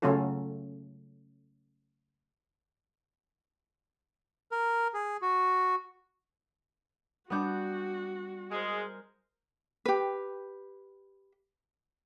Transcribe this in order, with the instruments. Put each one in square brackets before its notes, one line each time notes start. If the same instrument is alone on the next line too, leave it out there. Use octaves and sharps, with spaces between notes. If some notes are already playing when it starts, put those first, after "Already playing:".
[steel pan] C#3 F#3 A3 C#4 F4 A4
[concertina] A#4
G#4
F#4
[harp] G3 F#6 G6 [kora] B3 D4 [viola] F#4
[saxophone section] G#3 [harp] A#4 C5
[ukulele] G4 B4